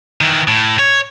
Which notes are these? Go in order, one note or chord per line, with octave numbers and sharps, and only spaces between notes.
D#3 E3
A2
C#5